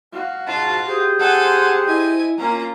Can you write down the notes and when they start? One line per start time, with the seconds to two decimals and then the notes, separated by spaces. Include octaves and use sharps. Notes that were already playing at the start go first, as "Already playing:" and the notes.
0.13 F#4 F5
0.47 G#2 B2 F4 A5
0.87 G4 G#4 C5
1.20 A4 F#5 G#5
1.86 E4 D#5 G#5
2.38 A#3 C#4 F4 A#5